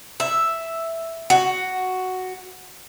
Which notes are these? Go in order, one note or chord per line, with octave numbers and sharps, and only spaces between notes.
E5
F#4